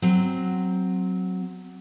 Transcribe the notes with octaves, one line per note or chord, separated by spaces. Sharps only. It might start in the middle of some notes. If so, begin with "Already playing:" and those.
F#3 C4